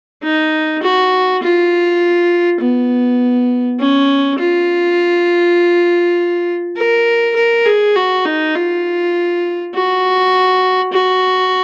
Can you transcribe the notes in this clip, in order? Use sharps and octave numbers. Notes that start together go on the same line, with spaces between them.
D#4
F#4
F4
B3
C#4
F4
A#4
A#4
G#4
F#4
D#4
F4
F#4
F#4